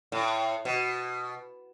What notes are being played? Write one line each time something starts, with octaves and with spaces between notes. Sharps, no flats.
A2
B2